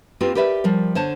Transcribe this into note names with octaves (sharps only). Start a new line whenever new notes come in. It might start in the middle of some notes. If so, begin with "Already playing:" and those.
A#3 C4 F4 G4 B4
G4 A#4 B4 D5 E5
F3 G3 A#4
D3 C5 C#5 A5